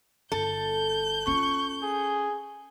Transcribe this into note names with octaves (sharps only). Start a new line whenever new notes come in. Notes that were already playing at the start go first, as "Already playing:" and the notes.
G1 A4 G6
C#4 F4 C#6
G#4